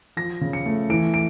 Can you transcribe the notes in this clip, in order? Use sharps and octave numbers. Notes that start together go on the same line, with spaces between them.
F3 A#6
C#3
C#7
A3
E3 D7
D7